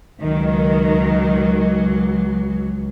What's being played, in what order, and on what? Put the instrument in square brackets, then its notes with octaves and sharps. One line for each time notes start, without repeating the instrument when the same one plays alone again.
[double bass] C#2 [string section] D#3 [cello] F#3